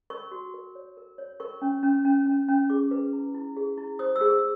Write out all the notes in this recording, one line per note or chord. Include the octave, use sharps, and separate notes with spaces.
A#4 C#6
F#4
A#4
C#5
A#4
C#5
A#4 C#6
C#4
C#4
C#4
C#4
C#4
G#4 D6
B4
E4
E4
G#4
E4
C5 D#6
E6
G#4
E6